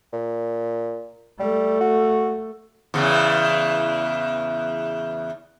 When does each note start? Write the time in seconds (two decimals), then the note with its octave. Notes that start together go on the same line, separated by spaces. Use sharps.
0.13 A#2
1.40 G3 A3
1.81 F#4
2.94 E2 C#3 E3